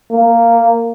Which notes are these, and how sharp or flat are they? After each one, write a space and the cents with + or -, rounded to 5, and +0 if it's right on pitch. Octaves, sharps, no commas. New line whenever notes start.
A#3 -10